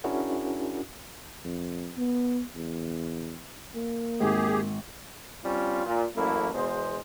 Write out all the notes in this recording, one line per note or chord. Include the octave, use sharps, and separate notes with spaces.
C#4 D4 E4 F#4 G#4 A#4
F2
B3
E2
A#3
G#1 G4 G#4
G3 C4 C#4 F4
A#2
A1 F#2 A3 A#3 E4
E2 B2 G#3 C5